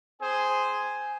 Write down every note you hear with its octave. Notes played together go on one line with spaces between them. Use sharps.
C4 G#4 C5 G#5